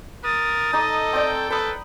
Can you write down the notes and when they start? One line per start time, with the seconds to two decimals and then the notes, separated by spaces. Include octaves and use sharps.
0.24 A#4 D#6 A6
0.73 D#4 A4 D#5 A#5 D6
1.13 C4 D5 G5
1.50 A4 B4 B5 D#6